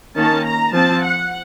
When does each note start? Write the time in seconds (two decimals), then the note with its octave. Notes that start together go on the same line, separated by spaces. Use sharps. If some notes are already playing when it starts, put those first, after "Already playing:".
0.16 D#3 A#3 C#4 A5
0.45 A#5
0.73 F3 C4 A5
1.02 F#5